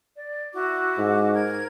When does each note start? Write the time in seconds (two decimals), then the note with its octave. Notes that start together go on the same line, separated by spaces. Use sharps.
0.14 D5
0.52 E4 F#4 D6
0.98 G#2
1.34 A#4 G#6